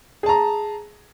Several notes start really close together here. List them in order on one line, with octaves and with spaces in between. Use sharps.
G#4 A5 A#5